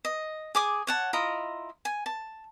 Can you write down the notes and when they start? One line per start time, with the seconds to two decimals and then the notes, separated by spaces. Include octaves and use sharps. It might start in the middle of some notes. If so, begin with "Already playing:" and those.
0.05 D#5
0.55 G#4 D6 D#6
0.87 C#5 F#5 A5
1.13 E4 F4 D#5 A#5
1.85 G#5
2.06 A5